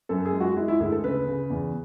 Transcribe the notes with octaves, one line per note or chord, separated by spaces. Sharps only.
F#2 A4
G#4
G#3
F#4
G#3 E4
E4
D2 G#4
A4
C#3 B4
C#3
E2